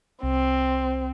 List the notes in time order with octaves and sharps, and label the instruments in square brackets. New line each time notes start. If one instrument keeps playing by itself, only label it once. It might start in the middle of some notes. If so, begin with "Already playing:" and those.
[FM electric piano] C2 [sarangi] C4